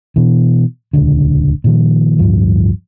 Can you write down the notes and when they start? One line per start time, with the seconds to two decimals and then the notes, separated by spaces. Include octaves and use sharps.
0.16 B2 E3
0.93 D#1 C#2 D3
1.64 A#2 D#3 F3
2.19 D1 G1 G2 F3